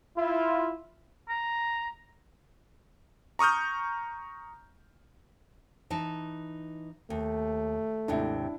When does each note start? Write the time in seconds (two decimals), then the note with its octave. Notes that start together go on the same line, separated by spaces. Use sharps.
0.18 E4 F4
1.29 A#5
3.39 A#5 C#6 D#6 F6 G6
5.90 E3 D#4 A5
7.10 D#2 A3
8.08 D#2 G#2 C3 D4 E4